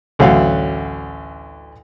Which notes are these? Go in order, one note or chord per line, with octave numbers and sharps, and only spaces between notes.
A1 D2 F#3 C#5 F5 F#5